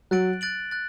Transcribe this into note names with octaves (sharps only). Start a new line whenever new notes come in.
F#3 F#6 A6 D7 F#7
F#6 A6 D7 F#7
F#6 A6